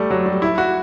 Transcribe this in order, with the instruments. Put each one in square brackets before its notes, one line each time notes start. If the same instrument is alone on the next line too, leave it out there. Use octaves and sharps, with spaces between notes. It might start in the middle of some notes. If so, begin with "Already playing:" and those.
Already playing: [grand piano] G3 A3
F#3
G3
E4
F#4